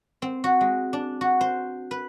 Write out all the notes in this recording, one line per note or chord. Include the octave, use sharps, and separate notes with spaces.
C4
F#4
G#3
D4
F#4
C5
B4